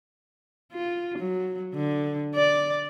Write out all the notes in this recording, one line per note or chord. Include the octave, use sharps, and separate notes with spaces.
F4
F#3
D3
D5